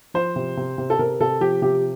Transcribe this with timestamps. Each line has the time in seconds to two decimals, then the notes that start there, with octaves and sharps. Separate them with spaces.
0.14 F3 C5
0.36 C3
0.57 C3
0.78 C3
0.90 A4
0.99 C3 A#4
1.20 C3 A4
1.41 F3 G4
1.62 C3 G4